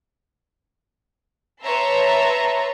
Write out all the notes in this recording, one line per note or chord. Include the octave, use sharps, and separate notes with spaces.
B4 C#5 E5 A5 A#5 C6